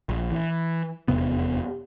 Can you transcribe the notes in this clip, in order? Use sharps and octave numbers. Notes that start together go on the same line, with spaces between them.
A#1
E3
F1 E2 C3 B3